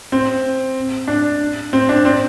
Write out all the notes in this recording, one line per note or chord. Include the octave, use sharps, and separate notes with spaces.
C4
D4
C4
D4
C4